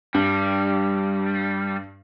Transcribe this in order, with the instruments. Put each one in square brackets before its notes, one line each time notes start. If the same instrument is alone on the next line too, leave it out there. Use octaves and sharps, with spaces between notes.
[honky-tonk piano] G2 [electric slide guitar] G3